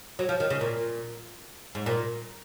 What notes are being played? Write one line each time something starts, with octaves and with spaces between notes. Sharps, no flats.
F#3
F3
D#3
C#3
A#2
G#2
A#2